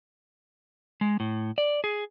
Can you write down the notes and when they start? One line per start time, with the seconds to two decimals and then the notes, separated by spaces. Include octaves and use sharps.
1.01 G#3
1.20 A2
1.58 D5
1.84 G#4